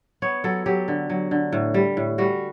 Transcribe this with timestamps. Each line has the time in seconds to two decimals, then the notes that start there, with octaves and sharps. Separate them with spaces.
0.22 B3 C#5
0.44 F#3 A4
0.66 F#3 G4
0.88 D3
1.10 F#3
1.31 D3
1.53 A2
1.74 G3
1.97 A2
2.18 G3 F#4